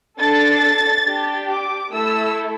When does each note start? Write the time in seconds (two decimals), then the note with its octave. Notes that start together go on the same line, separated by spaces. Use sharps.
0.20 D4 A4 A6
1.07 D4 G4
1.50 D6
1.92 A3 E4 A4 E6